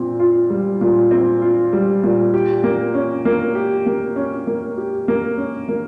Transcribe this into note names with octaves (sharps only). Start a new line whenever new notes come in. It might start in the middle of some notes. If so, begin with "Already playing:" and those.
Already playing: A#2 C4 F4
F4
G3
A#2
C4
F4
G3
A#2
G4
A#3
C#4
A#3
G4
A#3
C#4
A#3
G4
A#3
C#4
A#3